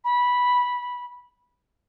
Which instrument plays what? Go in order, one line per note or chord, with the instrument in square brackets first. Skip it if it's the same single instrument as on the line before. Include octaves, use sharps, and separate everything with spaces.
[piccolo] B5